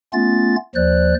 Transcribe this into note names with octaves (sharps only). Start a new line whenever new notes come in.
A3 B3 C#4 F4 A6
D#2 F3 C5 D5 F#6